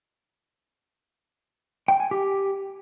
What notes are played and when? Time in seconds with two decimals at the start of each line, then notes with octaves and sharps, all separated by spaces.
1.88 G5
2.00 G#5
2.11 G4